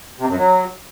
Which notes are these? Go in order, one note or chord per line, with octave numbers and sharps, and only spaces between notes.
C3
F#2
F#3